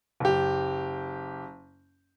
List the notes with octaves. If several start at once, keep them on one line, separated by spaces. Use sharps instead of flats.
F#1 G4